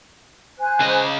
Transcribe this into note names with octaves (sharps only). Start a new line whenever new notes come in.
C5 G#5 F#6
C#3 D#5